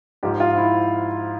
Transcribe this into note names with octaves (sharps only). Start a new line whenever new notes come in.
G#2 F3 G4
F4
E4